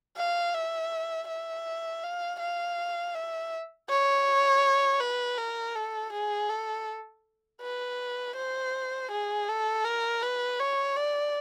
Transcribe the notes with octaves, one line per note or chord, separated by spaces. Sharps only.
F5
E5
E5
F5
F5
E5
C#5
B4
A#4
A4
G#4
A4
B4
C5
G#4
A4
A#4
B4
C#5
D5